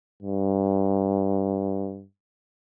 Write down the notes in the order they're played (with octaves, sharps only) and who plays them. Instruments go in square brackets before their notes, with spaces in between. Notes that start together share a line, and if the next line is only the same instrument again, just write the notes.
[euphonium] G2